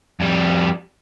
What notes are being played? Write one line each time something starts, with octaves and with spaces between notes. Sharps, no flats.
F2 G3